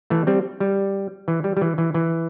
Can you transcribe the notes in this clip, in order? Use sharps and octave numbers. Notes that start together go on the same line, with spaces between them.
E3 A3
G3 C4
G3
E3
G3
G3
E3
E3
E3